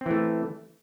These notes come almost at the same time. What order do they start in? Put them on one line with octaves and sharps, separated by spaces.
C4 E3 A3